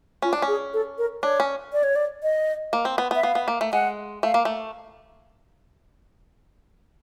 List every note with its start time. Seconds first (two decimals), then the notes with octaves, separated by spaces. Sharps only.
0.22 C#4 F4
0.33 D4
0.42 C#4
0.48 G#4
0.73 A4
0.98 A#4
1.23 D4 C#5
1.40 C#4
1.73 D5
1.83 C#5
1.96 D5
2.23 D#5
2.73 A#3
2.85 C4
2.98 B3
3.11 B3
3.15 E5
3.23 B3 F5
3.35 B3
3.48 A#3
3.61 A3
3.73 G#3 F#5
4.23 A3 F5
4.34 A#3
4.45 A3